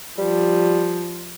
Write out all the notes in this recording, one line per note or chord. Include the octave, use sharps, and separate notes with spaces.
F3 G3